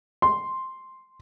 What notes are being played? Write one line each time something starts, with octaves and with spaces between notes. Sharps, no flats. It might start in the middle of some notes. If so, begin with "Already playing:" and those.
C6